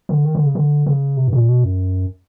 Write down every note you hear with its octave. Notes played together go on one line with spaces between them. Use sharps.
D3
D#3
D3
C#3
D3
C#3
C3
G2
B2
A#2
B2
F#2